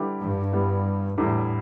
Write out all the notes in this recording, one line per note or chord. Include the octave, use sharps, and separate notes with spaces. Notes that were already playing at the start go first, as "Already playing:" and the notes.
Already playing: D3 G3 E4 G4 B4
G2
G3 B3 E4
E2 A2 D3 G3 E4